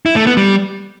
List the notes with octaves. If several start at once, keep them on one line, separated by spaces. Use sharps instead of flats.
E4
A3
B3
G3